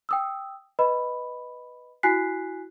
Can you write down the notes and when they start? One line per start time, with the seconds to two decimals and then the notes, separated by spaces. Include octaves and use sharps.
0.09 G5 D#6 E6
0.79 B4 D#5 B5
2.03 E4 F#4 G#5 F#6 B6 C7